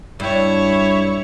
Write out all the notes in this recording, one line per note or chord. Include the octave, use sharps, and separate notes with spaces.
G2 E4 C#5